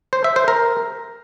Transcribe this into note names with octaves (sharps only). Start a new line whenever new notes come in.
C5
E5
C5
A#4